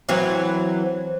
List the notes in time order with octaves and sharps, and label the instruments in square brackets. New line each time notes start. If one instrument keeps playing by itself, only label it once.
[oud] E3 F#3 C4